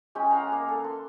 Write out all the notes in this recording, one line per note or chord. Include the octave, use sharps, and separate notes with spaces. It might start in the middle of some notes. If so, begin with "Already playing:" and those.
G#3 C#4 G#4 G5
F5 F#5 A#5
A#3
A4
C6